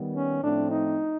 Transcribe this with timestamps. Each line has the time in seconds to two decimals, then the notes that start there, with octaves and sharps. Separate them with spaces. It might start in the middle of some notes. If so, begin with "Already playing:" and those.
Already playing: D#3 G3 B3
0.15 C#4
0.43 A2 F3 A3 C4 D4
0.71 D#4